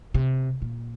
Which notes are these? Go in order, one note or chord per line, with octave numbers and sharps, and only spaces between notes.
C3
A#2